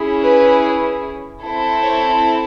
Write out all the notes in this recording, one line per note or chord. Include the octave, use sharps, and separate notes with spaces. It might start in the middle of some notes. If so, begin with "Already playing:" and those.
Already playing: C#4 E4 G#4
B4
C4 E4 A4
C#5